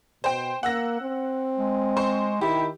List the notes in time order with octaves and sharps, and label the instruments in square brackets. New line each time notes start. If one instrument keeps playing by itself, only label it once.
[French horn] B2 [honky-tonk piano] C5 G5
[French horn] A#3 [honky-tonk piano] F#5 E6 A#6
[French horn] C4
[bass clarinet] G#3
[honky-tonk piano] C5 C6 C#6
[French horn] D#3 [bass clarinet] E4 [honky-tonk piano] G4